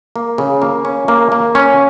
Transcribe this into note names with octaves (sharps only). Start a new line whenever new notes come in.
A#3
C#3
A#3
C#4
A#3
A#3
C#4